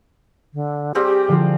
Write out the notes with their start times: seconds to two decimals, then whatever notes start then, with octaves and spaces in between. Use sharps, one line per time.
0.54 D3
0.95 G3 C4 G4 G#4
1.29 D3 F3 F4